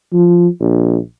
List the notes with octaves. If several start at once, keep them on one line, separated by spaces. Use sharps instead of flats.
F3
A#1